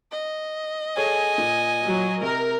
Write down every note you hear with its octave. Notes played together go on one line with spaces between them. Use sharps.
D#5
G#4 A4 C#5 G#5
A#2
F#3
C3 A#4